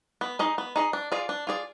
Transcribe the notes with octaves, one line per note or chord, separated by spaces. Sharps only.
B3
D#4 G#4 D#5
B3
D#4 G#4 D#5
D4
F4 G#4 D5
D4
F4 G#4 D5